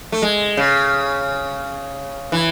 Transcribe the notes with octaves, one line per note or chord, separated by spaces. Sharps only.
A3
G#3
C#3
E3